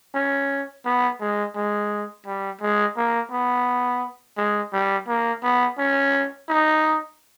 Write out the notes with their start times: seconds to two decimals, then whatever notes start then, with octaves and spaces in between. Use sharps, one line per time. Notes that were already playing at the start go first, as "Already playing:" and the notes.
0.14 C#4
0.85 B3
1.20 G#3
1.55 G#3
2.26 G3
2.61 G#3
2.97 A#3
3.31 B3
4.37 G#3
4.73 G3
5.08 A#3
5.43 B3
5.78 C#4
6.49 D#4